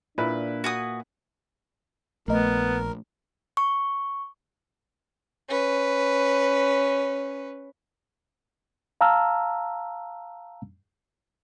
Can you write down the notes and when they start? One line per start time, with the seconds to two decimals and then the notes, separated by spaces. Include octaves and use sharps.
0.18 A#2 D4 E4 B4
0.64 F#4 G#5 D#6
2.28 A#1 A3 B3 A#4 D#5
3.57 C#6
5.49 C#4 B4
9.01 F5 A5 A#5 E6 F6